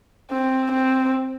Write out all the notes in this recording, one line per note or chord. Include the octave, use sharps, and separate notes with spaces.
C4
C4